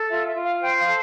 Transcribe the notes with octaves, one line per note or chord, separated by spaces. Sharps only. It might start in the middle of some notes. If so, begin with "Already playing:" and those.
Already playing: A4
F4 E5
E5
F4
F5
C5 G5
F5
A4